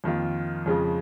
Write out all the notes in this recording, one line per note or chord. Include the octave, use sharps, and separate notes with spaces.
F2 D#3 A#3 F4
F2 C#3 F3 G#3